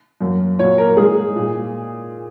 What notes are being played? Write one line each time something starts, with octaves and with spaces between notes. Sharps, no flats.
F#2 F#3 A#3
A#2 F#3 A#3 C#5
A#4
G#2 G#3 G#4
A#2 G#3